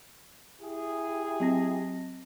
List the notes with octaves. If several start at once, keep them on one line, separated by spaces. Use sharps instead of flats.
E4 G4 G#4
F#3 C4 A#6